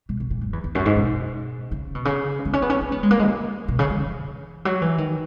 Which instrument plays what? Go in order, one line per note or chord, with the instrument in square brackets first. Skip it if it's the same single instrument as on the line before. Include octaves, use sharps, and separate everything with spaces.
[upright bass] B2
B2
A#2
F#2
E2
E2
F#2
G#2
B2
C#3
B2
C#3
B3
C#4
B3
C#4
C#4
B3
G#3
A#3
G#3
A#2
B2
C#3
E3
F#3
E3
D#3